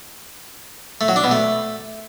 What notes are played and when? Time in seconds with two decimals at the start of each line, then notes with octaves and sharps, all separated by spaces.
1.01 A3
1.08 F#3
1.16 D4
1.24 B2
1.31 A3